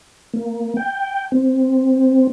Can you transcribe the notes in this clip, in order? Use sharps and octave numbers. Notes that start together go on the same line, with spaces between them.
A#3
G5
C4